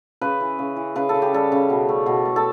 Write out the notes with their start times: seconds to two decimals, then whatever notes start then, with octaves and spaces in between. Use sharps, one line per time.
0.21 C#3 B4
0.40 E3
0.59 C#3
0.77 E3
0.96 C#3 B4
1.09 A4
1.14 C#3
1.22 G4
1.33 G3 A4
1.52 C#3
1.70 B2
1.89 A3
2.06 B2
2.25 A3
2.36 A4